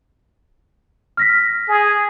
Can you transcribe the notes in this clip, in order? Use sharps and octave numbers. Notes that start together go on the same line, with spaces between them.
F6 A#6 B6
G#4